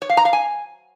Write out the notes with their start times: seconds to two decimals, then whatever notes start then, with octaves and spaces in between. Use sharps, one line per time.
0.02 C#5
0.10 F5
0.17 A#5
0.25 F5
0.33 G#5